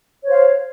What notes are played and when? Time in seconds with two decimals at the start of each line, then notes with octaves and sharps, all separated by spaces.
0.23 C#5
0.27 C5
0.31 F5